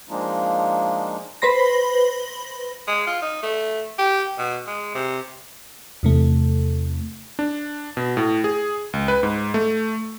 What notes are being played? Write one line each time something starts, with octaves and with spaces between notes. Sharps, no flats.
F3 G#3 A#3 D4 D#4 F4
B4 C5 B5 A#6
G#3
F4
D#4
A3
G4
B2
G#3
C3
E2 C3 A3
D4
B2
A2
G#4
C#2
B4
G#2
A3